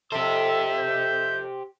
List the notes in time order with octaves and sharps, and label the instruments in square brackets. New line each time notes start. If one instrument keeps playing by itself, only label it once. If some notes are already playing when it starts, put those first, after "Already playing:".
[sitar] F2 A4 [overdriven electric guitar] G4 C5 [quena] E5 [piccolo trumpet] E6
[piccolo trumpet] G6